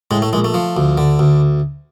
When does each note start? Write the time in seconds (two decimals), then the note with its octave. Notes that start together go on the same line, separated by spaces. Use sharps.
0.11 A2 G#3
0.22 A3
0.33 A#1 G#3
0.44 A3
0.54 F3
0.77 D2
0.98 D3
1.19 D2